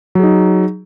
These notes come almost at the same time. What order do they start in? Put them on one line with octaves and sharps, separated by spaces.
F#3 G#4 D#4